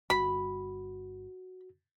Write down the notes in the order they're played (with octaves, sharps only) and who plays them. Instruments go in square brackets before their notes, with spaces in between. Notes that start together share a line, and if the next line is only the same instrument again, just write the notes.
[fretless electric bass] G1 [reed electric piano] F#4 [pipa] B5